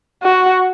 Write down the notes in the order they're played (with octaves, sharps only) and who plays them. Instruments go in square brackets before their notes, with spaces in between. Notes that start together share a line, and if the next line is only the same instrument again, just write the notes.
[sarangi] F#4